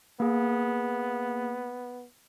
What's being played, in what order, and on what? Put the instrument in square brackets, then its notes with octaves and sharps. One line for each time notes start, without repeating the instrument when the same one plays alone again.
[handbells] A#3 G#4 [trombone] B3